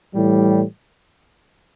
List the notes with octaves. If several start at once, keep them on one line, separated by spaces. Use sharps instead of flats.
A2 E3 G3